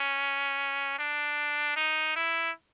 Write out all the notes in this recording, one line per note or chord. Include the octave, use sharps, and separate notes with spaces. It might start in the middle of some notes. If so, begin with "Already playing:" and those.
Already playing: C#4
D4
D#4
E4